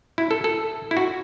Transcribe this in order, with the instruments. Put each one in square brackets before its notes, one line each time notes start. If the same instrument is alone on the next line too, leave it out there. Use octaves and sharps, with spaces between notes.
[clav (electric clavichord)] E4
A4
A4
E4
F#4